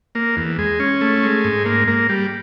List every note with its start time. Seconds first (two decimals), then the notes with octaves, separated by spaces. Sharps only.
0.15 A#3
0.37 E2
0.59 G#3
0.80 C#4
1.01 A3
1.23 G#3
1.44 G#2
1.66 A#3
1.88 A#3
2.09 G3